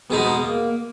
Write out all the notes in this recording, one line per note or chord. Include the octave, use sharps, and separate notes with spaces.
B2 G#3 B3 D#4
A#3